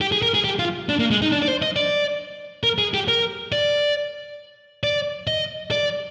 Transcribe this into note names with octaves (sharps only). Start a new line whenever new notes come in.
G4
G#4
A#4
G#4
G4
F4
D4
A#3
G#3
D#4
D4
D5
C5
D#5
D5
A#4
G#4
G4
A#4
D5
D5
D#5
D5